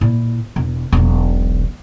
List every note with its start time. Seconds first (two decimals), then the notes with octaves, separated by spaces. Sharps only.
0.01 A#2 E4
0.56 E1
0.92 E1 B1